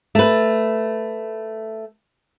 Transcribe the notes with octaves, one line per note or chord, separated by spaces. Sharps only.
A3 B4